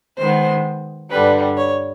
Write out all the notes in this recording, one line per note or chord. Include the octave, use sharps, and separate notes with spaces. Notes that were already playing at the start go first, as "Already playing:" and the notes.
D#3 G#3 B3 C5
G2 D3 G3 B4
C#5